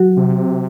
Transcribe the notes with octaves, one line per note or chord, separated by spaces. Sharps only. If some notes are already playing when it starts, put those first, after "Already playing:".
Already playing: F#3 F#4
C3